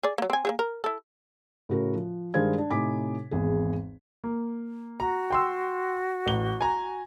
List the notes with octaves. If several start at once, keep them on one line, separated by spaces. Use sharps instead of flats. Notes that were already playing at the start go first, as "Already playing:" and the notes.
G#4 D5
F#3 A#3
C4 G#5
A#3 F#4 G#4
A#4
E4 A4
A2 C#3 F#4 A#4
F3
G2 D#3 G#3 C5 F5 G#6
D4
A2 C3 D#4 G#5 D6 B6
G#1 E2 G#4
A#3
F#4 A#5
G5 C6 E6
A1 G7
G#5 A#5